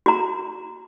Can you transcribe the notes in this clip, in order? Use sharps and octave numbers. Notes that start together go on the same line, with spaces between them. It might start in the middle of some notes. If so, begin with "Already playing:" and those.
F#4 A#5